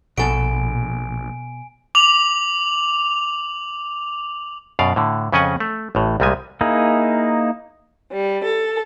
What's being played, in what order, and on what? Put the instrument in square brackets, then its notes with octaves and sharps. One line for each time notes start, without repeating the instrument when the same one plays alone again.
[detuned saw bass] A#1 [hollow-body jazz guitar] B2 A4 A5 [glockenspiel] G#5 D7
[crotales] D6 F7 F#7
[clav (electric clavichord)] F#2 B2 D5 F5
A2 D3
F2 C#3 C#4 D#5 F#5 G#5
A3
A1 A2
C2 A#2 G3 G#3 G#5
[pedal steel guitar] A#3 D#4 E4 G#4
[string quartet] G3
A4